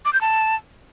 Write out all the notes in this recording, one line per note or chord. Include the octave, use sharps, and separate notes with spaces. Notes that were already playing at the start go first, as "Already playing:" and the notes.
D6
G6
A5